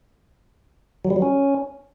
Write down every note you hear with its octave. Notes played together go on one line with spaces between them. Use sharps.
F#3
G3
F#3
C#4